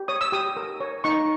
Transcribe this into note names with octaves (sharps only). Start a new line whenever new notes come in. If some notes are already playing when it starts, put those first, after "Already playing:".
Already playing: G4
C#5 D#6
E6
G4 D#6
A#4
C#5
D#4 C#6